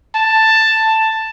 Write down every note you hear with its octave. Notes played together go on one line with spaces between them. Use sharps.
A5